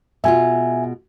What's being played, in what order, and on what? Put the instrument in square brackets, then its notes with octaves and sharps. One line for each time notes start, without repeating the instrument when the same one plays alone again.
[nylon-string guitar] B2 G#3 F4 [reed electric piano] E5 G#5